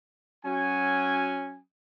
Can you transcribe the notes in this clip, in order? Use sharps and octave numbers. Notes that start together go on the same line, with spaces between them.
F#3 C#4 G#5